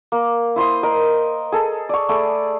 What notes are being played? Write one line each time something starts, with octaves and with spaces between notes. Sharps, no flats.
A#3
E4 C5 C6 D#6
A#4 D#5
G#4 A4
D5 C#6
A3 G#4 B5 D6